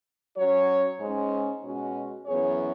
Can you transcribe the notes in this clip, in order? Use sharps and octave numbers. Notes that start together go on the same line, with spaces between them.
F#3 C#4 F#4 C#5
G#2 G#3 C#4
B2 G#3 C#4 F#4
F#2 E3 B3 G#4 C#5